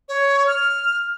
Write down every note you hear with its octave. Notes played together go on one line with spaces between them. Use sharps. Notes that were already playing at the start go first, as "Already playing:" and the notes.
C#5
F6